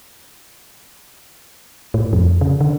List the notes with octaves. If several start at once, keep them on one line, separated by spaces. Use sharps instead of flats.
A2
F2
C#3
D3